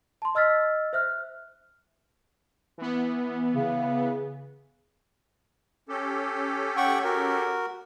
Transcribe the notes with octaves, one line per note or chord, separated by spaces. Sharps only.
A5 C6
D#5 E6 F6 A6 B6
C5 E5 F6 F#6
E3 B3
C#3
C#4 G4 A4
F#5 G5 C#6
F#4 A#4